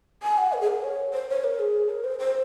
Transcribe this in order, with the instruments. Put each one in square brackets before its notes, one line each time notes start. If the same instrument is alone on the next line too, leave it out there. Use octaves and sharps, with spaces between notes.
[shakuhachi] G#5
F#5
A#4
G#4
A#4
C#5
C5
C#5
A#4
G#4
A#4
C5
C5